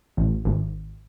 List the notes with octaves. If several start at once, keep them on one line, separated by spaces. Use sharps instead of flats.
A1
G#1